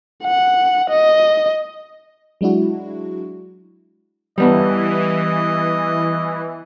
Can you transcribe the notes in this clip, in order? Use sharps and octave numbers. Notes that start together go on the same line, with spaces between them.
F#5
D#5
F#3 G#3 D4 E4 F#4
E3 G3 B3 D#5